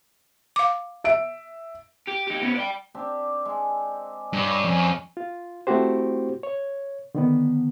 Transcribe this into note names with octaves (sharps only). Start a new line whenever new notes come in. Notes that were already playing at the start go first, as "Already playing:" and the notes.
F5 D6
E5 D7
G4
D#4 G4
B3 C#4
D5 G5
C4 D4 G4
G#3
G2 C#5 D5
F2 C#4
F4
A3 C4 E4 F#4 G4 C5
C#5
D3 D#3 B3